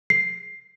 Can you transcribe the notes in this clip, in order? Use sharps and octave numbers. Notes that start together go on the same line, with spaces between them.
C7